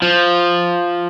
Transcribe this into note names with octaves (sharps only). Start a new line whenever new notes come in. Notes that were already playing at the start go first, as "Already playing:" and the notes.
F3